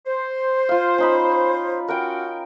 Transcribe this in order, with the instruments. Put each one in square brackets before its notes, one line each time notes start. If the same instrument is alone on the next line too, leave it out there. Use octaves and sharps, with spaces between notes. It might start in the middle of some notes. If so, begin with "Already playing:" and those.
[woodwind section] C5
[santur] F4 F5
C#4 D#4 B5
[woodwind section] C#4 F#4 F#5 [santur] A#4 G5